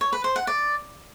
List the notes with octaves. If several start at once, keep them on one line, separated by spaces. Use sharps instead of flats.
C#5
B4
C5
F#5
D5